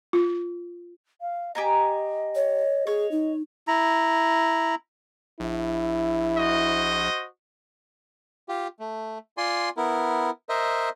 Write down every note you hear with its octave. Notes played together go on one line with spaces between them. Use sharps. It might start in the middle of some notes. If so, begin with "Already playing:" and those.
F4
F5
G4 D#5 G#5 A#5
C#5
G#4 C#5
D#4
E4 A#5
A#1 E4
F#4 C5 D#5
F4 G4
A3
F4 D5 G#5 C6
B3 E4 A#4
A#4 C5 D#5 E5